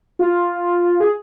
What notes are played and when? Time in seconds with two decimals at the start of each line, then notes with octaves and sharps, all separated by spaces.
0.19 F4
1.00 G#4